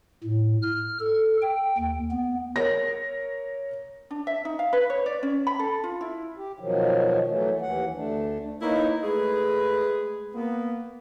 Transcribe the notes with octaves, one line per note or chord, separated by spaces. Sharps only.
A2
F6
A4
G5
D#2
B3
A#4 C#5 A#6
D4
E5
D#4
F5
B4
C#5
D5
C#4
B5
A4
F4
E4
G4
B2 D#3 F3 F#3
E3 F#3 A3
D#2 E3 F#5
D2 A3 D4
A#3 D#4 E4 B4 C#5
G#3 A3 G#4 B4
A#3 B3